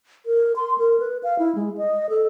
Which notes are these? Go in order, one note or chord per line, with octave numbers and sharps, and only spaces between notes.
A#4
C6
A#4
B4
F5
E4
G#3
D#5
A4